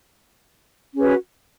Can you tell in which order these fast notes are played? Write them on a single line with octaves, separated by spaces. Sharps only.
C#4 G#4 B4 F#4